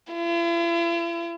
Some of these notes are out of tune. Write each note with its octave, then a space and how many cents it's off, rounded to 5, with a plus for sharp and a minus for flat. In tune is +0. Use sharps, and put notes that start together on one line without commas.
E4 +45